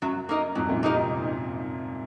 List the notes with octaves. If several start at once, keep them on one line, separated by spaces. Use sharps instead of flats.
F#2 F#3
A#3 D#4 A#4 D#5
F2 G#2 F#3
F#2 A#2
C3 A#3 D#4 A#4 D#5